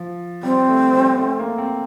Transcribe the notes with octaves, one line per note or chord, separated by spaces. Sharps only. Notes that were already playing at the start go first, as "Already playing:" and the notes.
Already playing: F3
G3 C4
A3
G3
A3
A#3
C4